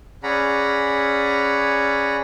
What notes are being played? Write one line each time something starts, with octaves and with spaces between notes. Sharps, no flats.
C#4 G#4 D5 F#5 A#5 B5